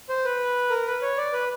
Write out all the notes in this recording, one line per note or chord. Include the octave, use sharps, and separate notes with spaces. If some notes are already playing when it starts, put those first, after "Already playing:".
C5
B4
A#4
B4
C#5
D5
B4